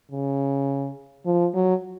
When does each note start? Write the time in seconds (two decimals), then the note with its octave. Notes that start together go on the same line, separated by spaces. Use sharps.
0.11 C#3
1.26 F3
1.54 F#3